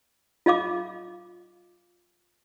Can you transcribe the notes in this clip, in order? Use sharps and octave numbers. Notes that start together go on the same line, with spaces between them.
F4 D#5 F5 D6